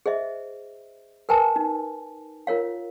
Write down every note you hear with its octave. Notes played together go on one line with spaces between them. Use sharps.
G#4 C5 D#5 E5
A#4 B4 G#5 A5
D#4
F4 A#4 C#5 F5